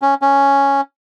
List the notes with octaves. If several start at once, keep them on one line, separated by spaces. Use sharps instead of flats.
C#4
C#4